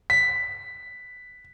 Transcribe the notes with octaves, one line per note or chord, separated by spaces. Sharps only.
B6